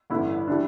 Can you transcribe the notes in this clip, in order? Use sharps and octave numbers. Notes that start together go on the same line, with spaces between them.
A1 G2 D3 E4
E3 G3 D4